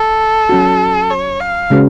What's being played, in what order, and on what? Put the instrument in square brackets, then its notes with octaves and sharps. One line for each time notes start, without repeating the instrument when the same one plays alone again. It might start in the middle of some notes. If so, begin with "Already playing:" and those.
Already playing: [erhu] A4
[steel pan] F#3 C#4 F#4
[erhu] C#5
F5
[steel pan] C#3 G#3 C#4 F#4 B4